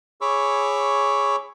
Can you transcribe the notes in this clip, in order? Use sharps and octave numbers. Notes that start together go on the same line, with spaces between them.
G#4 C#5 B5 C#6 D6 E6